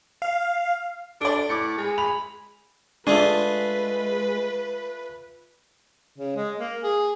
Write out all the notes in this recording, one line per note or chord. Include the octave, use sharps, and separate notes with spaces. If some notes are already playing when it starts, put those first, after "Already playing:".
F5
D4 A4 D5
A2 D6 C#7
G#3
B5 F7
G#3 A3 D4 F4 G#4 B4
C#3
G#3
A#3
G#4